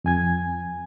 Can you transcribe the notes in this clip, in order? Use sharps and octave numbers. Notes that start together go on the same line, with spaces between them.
F2 G#5 G#6